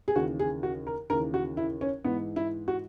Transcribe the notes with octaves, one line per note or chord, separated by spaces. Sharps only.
G#4
D#2 C#3 E3 F#4
G#4
F#4
A#4
D#2 C#3 E3 A#4
F#4
E4
C#4
G#2 E3 B3
E4
F#4